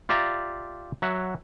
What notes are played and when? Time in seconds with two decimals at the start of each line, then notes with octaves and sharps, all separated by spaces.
0.09 F4 G4 D5 E5 A#5
1.02 F#3 E5 F#5